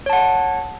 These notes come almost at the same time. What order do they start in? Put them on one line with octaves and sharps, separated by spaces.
C#5 A5 F#5